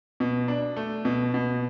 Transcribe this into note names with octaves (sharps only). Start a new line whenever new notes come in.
B2
D4
A3
B2
B2